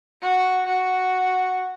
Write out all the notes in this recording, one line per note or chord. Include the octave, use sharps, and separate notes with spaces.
F#4
F#4